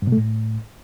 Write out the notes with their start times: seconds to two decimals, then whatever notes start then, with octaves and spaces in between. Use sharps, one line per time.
0.02 G2
0.07 B2
0.12 A3
0.17 A2